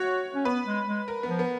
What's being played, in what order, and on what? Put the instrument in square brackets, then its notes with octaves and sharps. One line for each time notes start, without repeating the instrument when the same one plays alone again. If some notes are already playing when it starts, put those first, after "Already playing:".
Already playing: [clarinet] F#4 [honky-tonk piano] C#5 F#5
[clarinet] C#4
[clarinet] B3 [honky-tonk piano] B4
[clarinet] G#3
G#3
[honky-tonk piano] A#4
B3
[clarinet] F3
[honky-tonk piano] B3